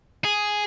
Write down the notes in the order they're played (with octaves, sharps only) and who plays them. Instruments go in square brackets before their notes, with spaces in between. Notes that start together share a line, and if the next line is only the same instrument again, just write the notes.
[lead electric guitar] G#4